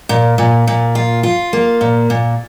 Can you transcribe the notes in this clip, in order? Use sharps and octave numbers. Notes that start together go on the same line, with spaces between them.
A#2
A#2
A#2
F4
F4
A#3
A#2
A#2